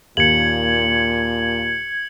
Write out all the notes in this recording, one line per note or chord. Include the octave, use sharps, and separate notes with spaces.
D#2 A#2 G#6 C#7 F#7